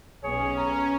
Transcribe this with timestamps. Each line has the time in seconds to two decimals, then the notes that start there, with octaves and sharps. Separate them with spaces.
0.23 B1 B3 C#4 G#4 C#5
0.57 A#5